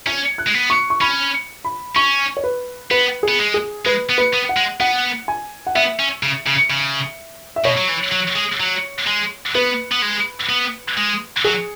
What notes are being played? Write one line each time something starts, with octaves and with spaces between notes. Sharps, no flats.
C#4 G#6
F#6
G#3
B3
C#6
C#6
C#4 B5
B5
C#4 C#6
C#5
B4
B3 B4
G#4
B3
G#3
G#4
G#3 B4
B3
B4
B3
F#5
G#3
B3 F#5
G#5
F#5
B3 E5
C#4
C#3
C#3
C#3
E5
B2 C#5
F#3
E3
F#3
G#3
F#3
G#3
B3 B4
B3
G#3
B3
G#3
F#3 G#4